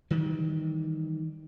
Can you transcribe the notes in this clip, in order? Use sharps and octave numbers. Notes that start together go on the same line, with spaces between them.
D#3 E3 G3